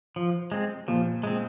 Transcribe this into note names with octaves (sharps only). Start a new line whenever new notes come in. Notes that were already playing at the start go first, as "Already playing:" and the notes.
F3
G#3 C4
A#2 F3
G#3 C4